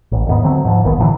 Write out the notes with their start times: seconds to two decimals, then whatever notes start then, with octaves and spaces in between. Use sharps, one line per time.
0.12 A1
0.27 D#2 G#2 B3
0.43 D2 D3 F#3 C4
0.65 G#2 F3
0.83 F#1 B1 D#3 B3
0.98 A2 D3 E3 F#3